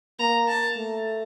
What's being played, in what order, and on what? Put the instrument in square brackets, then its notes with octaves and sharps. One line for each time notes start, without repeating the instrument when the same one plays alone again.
[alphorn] A#3 [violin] A#5
[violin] A5
[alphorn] A3